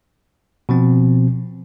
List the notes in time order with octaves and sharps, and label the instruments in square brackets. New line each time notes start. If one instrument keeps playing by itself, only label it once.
[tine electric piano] B2 F3 C4